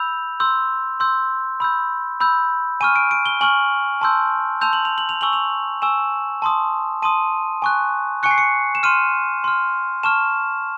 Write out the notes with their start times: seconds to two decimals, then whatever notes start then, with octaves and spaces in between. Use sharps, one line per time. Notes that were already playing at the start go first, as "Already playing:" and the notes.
Already playing: B5 E6 G6 F7
0.40 C6 E6 G6
1.00 C6 E6 G6
1.60 B5 E6 G6
2.20 B5 E6 G6
2.81 G#5 C#6 F6 D#7
2.96 D7
3.11 D7
3.26 G7
3.41 G#5 C#6 F6 F#7
4.01 A5 C6 E6 G6
4.61 A5 C6 E6 G6 F7
4.73 F#7
4.85 F7
4.98 F#7
5.09 F7
5.21 G#5 C#6 E6 F#7
5.33 F7
5.82 G#5 C#6 E6 E7
6.42 A5 C6 D#6
7.02 A5 C6 D#6 D#7
7.62 G#5 C#6 F#6
8.23 G#5 C#6 F#6 C#7
8.31 C7
8.38 C#7
8.75 E7
8.83 C6 F6 D#7
9.44 C6 F6
10.03 A5 C#6 F6 E7